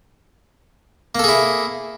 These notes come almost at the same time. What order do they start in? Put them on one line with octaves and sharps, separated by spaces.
A#3 A4 G#4 E4